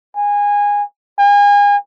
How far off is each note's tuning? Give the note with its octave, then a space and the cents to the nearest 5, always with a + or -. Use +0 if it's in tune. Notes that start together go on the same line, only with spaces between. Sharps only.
G#5 -20
G#5 -35